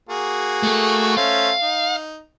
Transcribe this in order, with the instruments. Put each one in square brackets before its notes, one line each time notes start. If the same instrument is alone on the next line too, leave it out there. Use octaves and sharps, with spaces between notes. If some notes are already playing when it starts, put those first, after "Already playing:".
[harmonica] A#3 F#4 G#4
[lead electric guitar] A3 A4
[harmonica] A3 C#4 C5 [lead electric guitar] F5
[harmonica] D#4